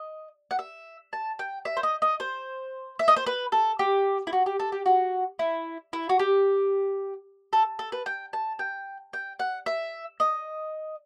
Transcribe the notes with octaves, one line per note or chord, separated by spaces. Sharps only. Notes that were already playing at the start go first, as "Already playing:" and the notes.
Already playing: D#5
F#5
E5
A5
G5
E5
C5
D#5
D#5
C5
E5
D#5
C5
B4
A4
G4
E4
F#4
G4
A4
G4
F#4
E4
E4
F#4
G4
A4
A4
B4
G5
A5
G5
G5
F#5
E5
D#5